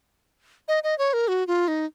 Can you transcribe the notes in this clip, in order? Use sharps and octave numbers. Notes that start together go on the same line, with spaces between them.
D#5
D#5
C#5
A#4
F#4
F4
D#4